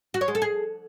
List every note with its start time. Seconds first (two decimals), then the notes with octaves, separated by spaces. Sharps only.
0.14 F#4
0.21 C#5
0.28 G#3
0.35 A4
0.42 G#4